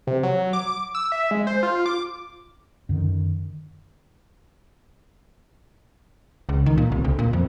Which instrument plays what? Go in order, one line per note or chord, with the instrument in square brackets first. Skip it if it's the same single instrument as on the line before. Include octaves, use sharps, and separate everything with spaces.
[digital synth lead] C3
F#3
D6
E6
E5
G#3
C5
F4
D6
[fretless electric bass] F#2 D3 D#3
[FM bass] C#2
D#3
A#2
C2
D2
A#2
F2